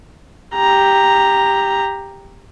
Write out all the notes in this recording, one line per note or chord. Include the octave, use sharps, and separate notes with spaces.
G4 A#5